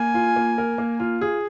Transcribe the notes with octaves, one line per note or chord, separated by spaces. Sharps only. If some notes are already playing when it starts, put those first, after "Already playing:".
Already playing: A#3 G#5
F4
A#3
A#4
A#3
F4
G#4